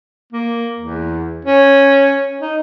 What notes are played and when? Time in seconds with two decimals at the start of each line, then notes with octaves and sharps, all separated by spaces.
0.32 A#3
0.78 E2
1.45 C#4
2.41 D#4